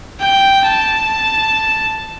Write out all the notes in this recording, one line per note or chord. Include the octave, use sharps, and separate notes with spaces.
G5
A5